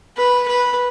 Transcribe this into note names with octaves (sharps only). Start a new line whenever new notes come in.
B4
B4